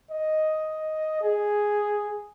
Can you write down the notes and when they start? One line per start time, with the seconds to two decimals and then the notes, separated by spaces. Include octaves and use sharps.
0.11 D#5
1.21 G#4